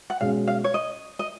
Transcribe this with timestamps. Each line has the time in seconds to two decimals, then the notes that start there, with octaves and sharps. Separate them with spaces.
0.10 F#5
0.21 B2 G#3 C#4 F5
0.48 F5
0.64 C#5
0.74 D#5
1.19 D#5